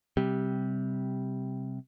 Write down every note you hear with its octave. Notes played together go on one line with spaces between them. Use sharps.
C3 G3